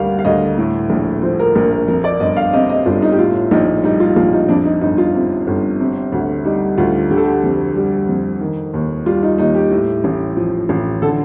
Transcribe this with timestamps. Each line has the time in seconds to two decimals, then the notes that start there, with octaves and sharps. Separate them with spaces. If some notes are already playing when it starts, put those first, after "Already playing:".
Already playing: D2 G3 A#4 F5
0.19 F5
0.25 D2 D#5
0.58 A2
0.90 A#1
1.22 F3 C5
1.39 A#4
1.56 A#1 A#4
1.71 A#4
1.88 F2 A#4
2.04 D5
2.20 G1 D#5
2.37 F5
2.53 C3 D#5
2.69 D#5
2.85 G1 F4
3.02 D#4
3.12 G4
3.18 A2 F4
3.51 A#1 D#4
3.84 G3 D#4
4.00 F4
4.16 A#1 F4
4.33 D#4
4.49 F2 D4
4.65 D#4
4.81 G1 D#4
4.98 F4
5.14 C3
5.47 G1
5.80 C3
6.12 D2
6.45 G3 D#4
6.78 D2 F4
7.10 D3 G4
7.17 A4
7.24 G4
7.43 F2
7.76 G3
8.08 F2
8.41 D#3
8.73 D#2
9.06 G3 F4
9.23 D#4
9.38 D#2 D#4
9.55 G4
9.71 A2
10.04 A1
10.37 F3
10.69 A1
11.02 D3 A4